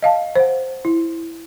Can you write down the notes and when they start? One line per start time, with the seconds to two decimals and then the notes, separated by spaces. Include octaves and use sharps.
0.02 D#5 F5 A5
0.36 C5 F#5
0.85 E4